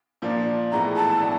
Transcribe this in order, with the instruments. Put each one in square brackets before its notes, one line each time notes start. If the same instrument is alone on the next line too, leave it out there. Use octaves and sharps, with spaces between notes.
[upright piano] A#2 F3 A#3 D4
[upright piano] A2 E3 G#3 B3 [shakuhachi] A#5
[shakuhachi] A5
[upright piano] A2 F#3 B3 D4